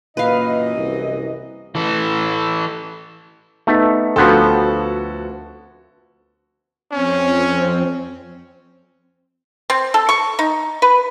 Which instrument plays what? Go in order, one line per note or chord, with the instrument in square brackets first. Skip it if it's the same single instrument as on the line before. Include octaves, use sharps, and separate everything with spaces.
[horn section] F#2 E3 D#5 [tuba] A#2 [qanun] B4 F5
[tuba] C2
[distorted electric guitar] E3 A4
[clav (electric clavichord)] A3 [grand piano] B3 D#4
[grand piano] D2 [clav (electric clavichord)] F3 B3 C4 [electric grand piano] F#4 A4
[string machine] F2 C4 [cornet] C#4
[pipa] C4
A4
C#6
D#4
B4